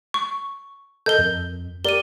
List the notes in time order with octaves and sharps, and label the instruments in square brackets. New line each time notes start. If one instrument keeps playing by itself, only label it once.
[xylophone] C#6
[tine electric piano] A4 A#4 D#5 [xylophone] G6 G7
[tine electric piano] F2
[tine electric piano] G4 A#4 D5 [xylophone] D#7 G7